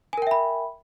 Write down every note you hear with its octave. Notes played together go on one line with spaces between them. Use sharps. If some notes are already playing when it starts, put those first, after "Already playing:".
A#4 E5 G5 G#5 B5